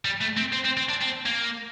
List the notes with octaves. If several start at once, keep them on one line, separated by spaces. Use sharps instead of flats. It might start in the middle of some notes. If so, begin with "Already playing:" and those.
G3
A3
C4
C4
C4
C4
D4
C4
A#3